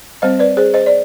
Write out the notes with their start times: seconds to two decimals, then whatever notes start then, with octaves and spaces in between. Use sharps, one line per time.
0.22 G3 C4 C5 D#5
0.39 B4 D5
0.57 G#4 C5
0.74 C5 D#5
0.86 D5